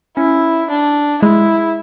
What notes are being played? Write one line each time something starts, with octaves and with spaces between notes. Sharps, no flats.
C#4 E4
D4
G#3 E4